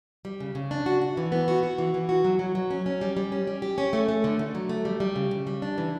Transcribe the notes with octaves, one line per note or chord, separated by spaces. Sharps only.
G3
C#3
C#3
D4
F#4
F#4
E3
B3
F#4
F#4
E3
E3
F#4
F#3
F#3
F#3
C#4
C#4
G3
G3
C#4
G3
G4
C#4
A3
A3
D3
D3
F#3
A3
G3
G3
C#3
C#3
G3
D4
E3